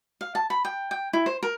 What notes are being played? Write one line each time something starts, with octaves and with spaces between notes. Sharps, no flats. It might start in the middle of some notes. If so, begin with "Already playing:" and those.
F5
A5
B5
G5
G5
E4
C5
A#4